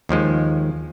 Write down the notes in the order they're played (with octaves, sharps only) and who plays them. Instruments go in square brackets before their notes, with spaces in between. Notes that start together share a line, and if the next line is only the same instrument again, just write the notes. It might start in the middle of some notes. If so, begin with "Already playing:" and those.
[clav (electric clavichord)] D#2 D#3 F3 G#3